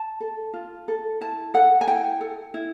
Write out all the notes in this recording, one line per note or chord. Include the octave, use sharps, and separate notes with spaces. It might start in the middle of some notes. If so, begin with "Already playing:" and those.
Already playing: A5
A4
F4
A4
E4 A5
A4 F#5
G#5
E4 G5
A4
E4